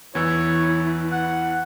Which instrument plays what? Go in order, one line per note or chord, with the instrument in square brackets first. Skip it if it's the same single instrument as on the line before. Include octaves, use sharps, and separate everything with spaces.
[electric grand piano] E2 E3 E6 [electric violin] E4 [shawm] C#5
[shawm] F#5